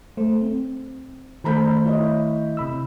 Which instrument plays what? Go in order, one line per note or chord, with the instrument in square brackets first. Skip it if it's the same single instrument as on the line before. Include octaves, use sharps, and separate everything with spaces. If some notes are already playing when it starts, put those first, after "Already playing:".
[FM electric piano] A3 C5
C4
[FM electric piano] D#3 A3 G6 [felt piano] C5 A#5 B5
[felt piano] E4 C#5 D#5
[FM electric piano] C3 B5 E6